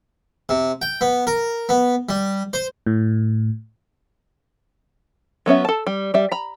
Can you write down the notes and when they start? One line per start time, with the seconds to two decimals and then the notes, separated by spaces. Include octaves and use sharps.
0.49 C3
0.82 G5
1.01 B3
1.27 A#4
1.69 B3
2.09 G3
2.53 C5
2.86 A2
5.46 F#3 B3 C#4 E5
5.65 A4 A5
5.87 G3
6.14 G3 E5
6.32 A#5 B5